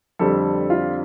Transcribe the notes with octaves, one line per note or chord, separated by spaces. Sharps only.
F2 D3 G3 C4 A4
F4